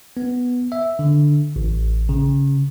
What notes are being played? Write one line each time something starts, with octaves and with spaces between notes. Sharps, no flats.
B3
E5
D3
A1
C#3